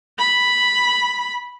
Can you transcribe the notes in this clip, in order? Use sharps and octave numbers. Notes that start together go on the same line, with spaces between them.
B5